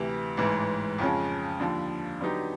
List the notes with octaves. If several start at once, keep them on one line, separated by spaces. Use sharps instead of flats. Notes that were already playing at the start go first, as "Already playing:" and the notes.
Already playing: D2 C3 E3
A1 G#2 E3
F2 C#3 F3 G#3 C#4
D#2 D3 F3
D3 F#3 B3 D#4 G4